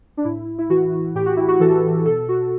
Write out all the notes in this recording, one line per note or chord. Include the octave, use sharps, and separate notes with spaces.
D4
A2 E4
E4
E3 F#4
A2 G4
F#4
E4
F#4
E3 A4
B2 A4
F#4